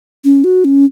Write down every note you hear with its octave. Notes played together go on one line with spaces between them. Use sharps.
C#4
F#4
C#4